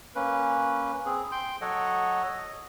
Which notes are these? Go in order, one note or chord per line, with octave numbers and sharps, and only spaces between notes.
A#3 C#4 B4
C4 G#4
G5 C6 G6
F#3 A4 C#5 D#5 F#5
D#5